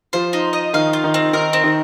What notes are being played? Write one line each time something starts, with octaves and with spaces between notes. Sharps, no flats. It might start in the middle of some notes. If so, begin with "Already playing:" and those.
F3 F4 C5
D#4
D#5
D#3 D#4 F5
F4
D#3 D#4
C4
D#3 D#4 A#4
C4
D#3 D#4